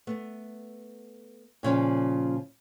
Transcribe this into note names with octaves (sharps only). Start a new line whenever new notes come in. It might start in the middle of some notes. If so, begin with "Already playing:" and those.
A3 B3
A#2 C#3 F3